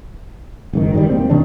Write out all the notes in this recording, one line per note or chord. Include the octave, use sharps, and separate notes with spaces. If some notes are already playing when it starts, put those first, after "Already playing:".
F#1 G#2 D#3
D#3 F#3 G3
E1 A#3 C4
B2 D#3 D4